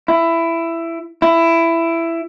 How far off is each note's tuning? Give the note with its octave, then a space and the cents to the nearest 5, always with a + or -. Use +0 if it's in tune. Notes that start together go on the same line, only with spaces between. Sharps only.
E4 +15
E4 +15